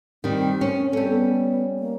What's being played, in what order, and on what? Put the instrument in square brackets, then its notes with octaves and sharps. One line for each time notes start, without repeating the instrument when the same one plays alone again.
[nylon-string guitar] D#3 G3 [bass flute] C4
[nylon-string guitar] C#4
[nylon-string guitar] G3 C#4 [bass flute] A4
[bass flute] B3
A#3